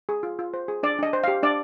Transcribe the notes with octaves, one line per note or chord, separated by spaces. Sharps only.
G#4
F4
F4
C5
G#4
D4 D5
D4 D#5
C5
G4 F5
D4 D5